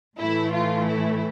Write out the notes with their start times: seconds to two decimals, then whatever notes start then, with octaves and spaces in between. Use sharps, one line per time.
0.19 A2 E3 A3 E4
0.53 F4
0.87 E4